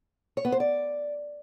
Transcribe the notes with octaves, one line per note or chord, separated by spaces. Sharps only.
C#5
B3
C5
D5